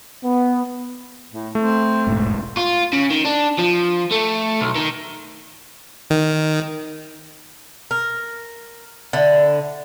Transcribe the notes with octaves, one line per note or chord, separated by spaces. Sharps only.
B3
A2
A3 C4
E1 A1 G#2
F4
C#3
D#3
D4
F3
A3
B1
D#3
D#3
A#4
D3 E4